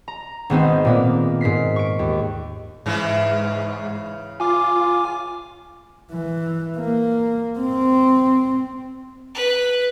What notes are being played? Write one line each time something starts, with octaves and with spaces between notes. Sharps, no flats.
A#5
G#1 B3 C4 D#4
A#2 A#3 B3
G#2 A#4 B6 C7
C#6 D7
D#2
G#2 C#3 E3
F4 G#5 D6
E3
A#3
C4
B4